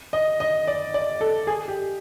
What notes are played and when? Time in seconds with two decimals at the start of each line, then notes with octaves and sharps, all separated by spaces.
0.13 D#5
0.40 D#5
0.67 D5
0.94 D5
1.21 A4
1.47 G#4
1.68 G4